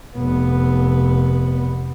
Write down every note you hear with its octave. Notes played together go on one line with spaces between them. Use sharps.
F1 B3